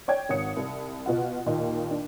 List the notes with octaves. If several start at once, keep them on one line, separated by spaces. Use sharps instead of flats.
C#5 D5 G5 G#6
G#1 C#5 F#5 D#6 C#7
C2
B2 F4 F#5
D#2 A#2 D#5
D4